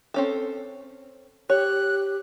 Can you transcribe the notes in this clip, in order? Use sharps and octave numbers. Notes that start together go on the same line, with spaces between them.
C4 C#4 A4
G4 C#5 F#6